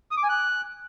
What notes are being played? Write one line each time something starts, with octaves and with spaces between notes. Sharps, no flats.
D#6
D6
G#5
F#6